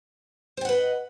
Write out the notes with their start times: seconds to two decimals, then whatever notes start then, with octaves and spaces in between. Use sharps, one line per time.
0.57 C5
0.61 G5
0.65 F#5
0.69 B4
0.73 D#5